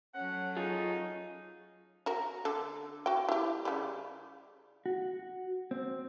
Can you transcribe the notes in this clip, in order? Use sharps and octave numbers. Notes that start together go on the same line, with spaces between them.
F#3 A3 C#4 F#5
D#4 F4 G#4
F#4 A#4
D3 A4
F#4 G5
E4 G4
C#3 G3
F#4
C4